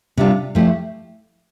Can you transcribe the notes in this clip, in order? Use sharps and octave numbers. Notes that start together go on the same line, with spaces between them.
C3 G3 D4 F4
F3 A3 E4 G4